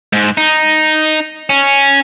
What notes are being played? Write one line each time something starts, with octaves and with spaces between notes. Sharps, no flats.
G#2
D#4
C#4